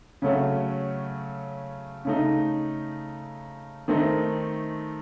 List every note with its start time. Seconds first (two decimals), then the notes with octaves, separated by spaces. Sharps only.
0.22 C#3 F#3 A3 C#4
2.05 C#3 A3 D#4
3.88 D#3 A3 C4 D#4